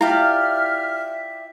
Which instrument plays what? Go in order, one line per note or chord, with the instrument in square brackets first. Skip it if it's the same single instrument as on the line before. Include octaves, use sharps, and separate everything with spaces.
[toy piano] E4 [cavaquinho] F4 G4 D5 [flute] E5 [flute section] F6